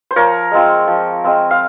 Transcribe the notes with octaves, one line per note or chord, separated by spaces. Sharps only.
C5
F3 A#4 C#5
G#3 C4 F4
F3
G#3 C4 F4
F5